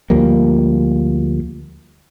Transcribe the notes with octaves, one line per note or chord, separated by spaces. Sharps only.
D2 F3 G3 A#3